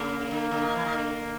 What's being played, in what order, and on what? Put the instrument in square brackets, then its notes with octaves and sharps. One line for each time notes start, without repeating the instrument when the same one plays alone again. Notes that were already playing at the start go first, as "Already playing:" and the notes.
Already playing: [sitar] C#3 [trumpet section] A#3
[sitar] D3
D3
D#3
E3
D#3
D3